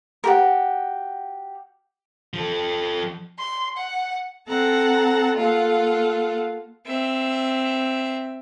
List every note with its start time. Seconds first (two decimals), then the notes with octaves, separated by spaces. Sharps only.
0.24 F#4 G4 A#4
2.33 F3 A4
3.39 C6
3.77 F#5
4.48 C4 A4 F#5 A5 A#5
5.37 A#3 F4 A4 F5 F#5
6.86 C4 E5